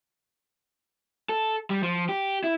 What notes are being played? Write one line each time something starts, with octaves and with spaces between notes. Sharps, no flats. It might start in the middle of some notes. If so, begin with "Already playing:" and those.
A4
G3
F3
G4
E4